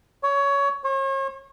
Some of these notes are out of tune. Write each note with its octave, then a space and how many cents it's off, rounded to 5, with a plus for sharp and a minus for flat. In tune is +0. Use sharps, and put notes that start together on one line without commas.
C#5 +20
C#5 -40